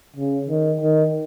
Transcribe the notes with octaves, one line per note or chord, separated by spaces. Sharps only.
C#3
D#3
D#3